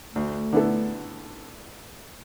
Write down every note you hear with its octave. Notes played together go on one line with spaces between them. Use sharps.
D2 A3
D3 B3 E4 A4